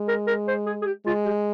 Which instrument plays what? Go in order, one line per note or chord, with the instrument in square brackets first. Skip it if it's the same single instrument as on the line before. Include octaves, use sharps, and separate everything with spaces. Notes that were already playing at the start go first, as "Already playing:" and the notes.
Already playing: [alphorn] G#3
[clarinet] A#4
A#4
C5
G#4
G#4
G4
[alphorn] G#3 [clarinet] F4
[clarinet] G4